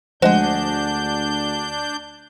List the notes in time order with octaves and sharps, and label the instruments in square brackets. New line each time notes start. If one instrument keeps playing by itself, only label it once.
[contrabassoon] D2 [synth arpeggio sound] F3 G#3 [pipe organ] D4 G6 [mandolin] F#4 G#4